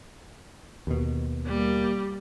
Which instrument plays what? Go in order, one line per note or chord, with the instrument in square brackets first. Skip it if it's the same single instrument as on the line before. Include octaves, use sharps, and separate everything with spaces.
[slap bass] D#2 B2
[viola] G3 [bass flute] A#3